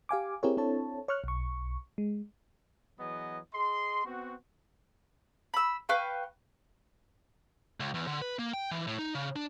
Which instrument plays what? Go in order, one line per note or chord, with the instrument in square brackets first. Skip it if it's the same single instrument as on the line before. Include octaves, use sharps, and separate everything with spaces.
[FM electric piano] G4 F5 G#5 D6
C4 E4 G4 G#4 A#4 C#5
C4 D4 E4 A4 C#5 A5
C#5 C#6 F6 F#6
B1 C#6
G#3
[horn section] E3 F#3 B3 G#4 D#5
G#4 D#5 C6
B3 C4 F#4
[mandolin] B5 E6
B4 F5 G5 C#6
[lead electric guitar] C#2
E2
D3
B4
A#3
G5
E3
A2
D#4
C#3
D4